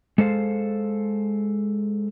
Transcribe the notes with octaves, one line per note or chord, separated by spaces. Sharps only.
G#3 A4 C5 F5